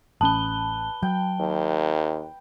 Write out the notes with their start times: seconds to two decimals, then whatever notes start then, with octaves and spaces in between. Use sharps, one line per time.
0.21 A1 C#4 B4 A5 G7
1.03 F#3 G5
1.40 D#2